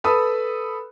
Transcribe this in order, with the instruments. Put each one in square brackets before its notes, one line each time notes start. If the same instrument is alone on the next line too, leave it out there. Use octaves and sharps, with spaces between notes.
[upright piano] A4 B4 B5 D#6 E6